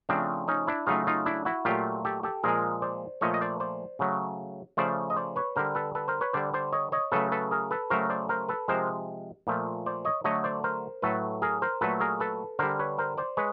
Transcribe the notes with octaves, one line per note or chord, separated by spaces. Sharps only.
C#3 F3 A3 C4 D4
C#4 D#4
D4 E4
C#3 F#3 A3 D#4 F4
D#4 F4
D4 E4
E4 F#4
A#2 F#3 A3 F4 G4
G4 A4
G4 A4
A#2 F3 G#3 G#4 A#4
C5 D5
A#2 F3 A3 C#5 D#5
D#5
C5 D5
C5 D5
C#3 F#3 A3
C#3 F3 A3 C5 D5
D#5
C5 D5
B4 C#5
D3 G3 A#4 C5
A4 B4
A4 B4
A#4 C5
B4 C#5
D3 G3 C5 D5
C5 D5
C#5 D#5
C#5 D#5
C#3 F#3 A3 A4 B4
A4 B4
G#4 A#4
A4 B4
C#3 F#3 A3 A#4 C5
C5 D5
A#4 C5
A4 B4
C3 F3 G#3 A#4 C5
A#2 F3 A3
C5 D5
C#5 D#5
D3 F#3 A3 C#5 D#5
C5 D5
A#4 C5
A2 F#3 A3 A4 B4
G#4 A#4
A#4 C5
A#2 F#3 A3 A4 B4
G#4 A#4
A4 B4
D3 G3 A#4 C5
B4 C#5
A#4 C5
C5 D5
G#3 B4 C#5